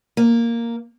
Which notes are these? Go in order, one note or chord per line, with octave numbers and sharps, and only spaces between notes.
A#3